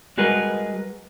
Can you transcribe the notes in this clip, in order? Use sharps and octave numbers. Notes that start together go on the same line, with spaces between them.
G3 G#3 F#4 G#4 A#4 B4